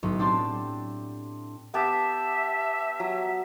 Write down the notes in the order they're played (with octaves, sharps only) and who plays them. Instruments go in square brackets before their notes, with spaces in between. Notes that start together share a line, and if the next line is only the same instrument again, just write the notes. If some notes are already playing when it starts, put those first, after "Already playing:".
[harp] B1 A2
C4 D4 G4 A5 C6
[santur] B3 G4 A5 [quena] E5
[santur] F#3